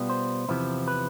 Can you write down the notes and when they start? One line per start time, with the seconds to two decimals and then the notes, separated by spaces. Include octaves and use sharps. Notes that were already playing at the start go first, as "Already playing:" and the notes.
Already playing: B2 G3 B3 F4
0.09 C5
0.49 E2 C3 F3 B3 E4
0.88 B4